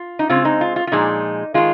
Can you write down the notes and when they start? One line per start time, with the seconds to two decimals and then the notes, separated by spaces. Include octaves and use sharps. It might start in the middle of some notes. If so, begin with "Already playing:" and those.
Already playing: F4
0.19 D#4
0.29 C#3 G#3 C4 F4
0.45 D#4
0.61 F4
0.76 F4
0.87 F4
0.92 A#2 F3 G#3 D#4
1.54 D#3 G#3 F4